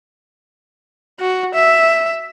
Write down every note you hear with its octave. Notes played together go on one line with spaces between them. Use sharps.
F#4
E5